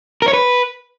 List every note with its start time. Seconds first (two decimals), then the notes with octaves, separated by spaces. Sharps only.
0.22 A#4
0.28 C#5
0.33 B4